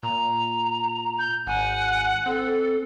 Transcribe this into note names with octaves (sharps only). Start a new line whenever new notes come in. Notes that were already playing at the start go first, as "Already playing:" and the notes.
A#2 A#5
G6
G#1 F#5 G#5
C4 A4